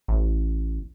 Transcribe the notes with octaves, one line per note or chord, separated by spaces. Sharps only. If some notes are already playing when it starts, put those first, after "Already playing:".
A1